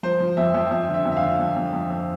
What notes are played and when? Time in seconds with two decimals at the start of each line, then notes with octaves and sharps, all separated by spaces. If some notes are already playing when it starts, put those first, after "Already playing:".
0.03 F3 C5
0.20 F3
0.37 F2 E5
0.54 F2 E5
0.71 F2 E5
0.88 D3
0.94 E5
1.05 F2
1.12 E5
1.17 F5
1.22 D3
1.39 F2
1.56 F2
1.73 F2
1.90 F2